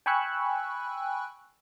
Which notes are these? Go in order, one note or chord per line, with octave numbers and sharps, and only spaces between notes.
G5 G#5 B5 C#6 E6 F#6